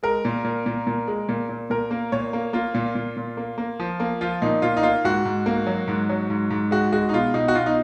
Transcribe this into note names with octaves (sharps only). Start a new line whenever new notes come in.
G#3 A#4
A#2
A#2
A#2
A#2
G#3
A#2
A#2
A#2 A#4
A#3
A#2 C#5
A#3
A#3 F4
A#2
A#2
A#2
A#3
A#3
F3
A#3
F3 F4
A#2 D#4
A#2 F4
D#4
A#3 F4
G#2 F#4
G#2
A#3
F#3
G#2
F#3
G#2
G#2
G#3 F#4
G#3 F#4
D#4
B2 F4
B2 D#4
F#4
B2 F4
D#4